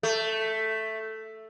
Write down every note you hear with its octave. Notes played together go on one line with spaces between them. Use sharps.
A3